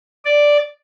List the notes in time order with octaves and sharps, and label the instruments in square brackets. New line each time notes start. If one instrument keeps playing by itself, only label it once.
[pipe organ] D5